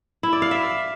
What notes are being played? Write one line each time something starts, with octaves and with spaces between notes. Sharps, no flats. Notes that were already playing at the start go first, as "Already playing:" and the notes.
E4
D5
F5
E5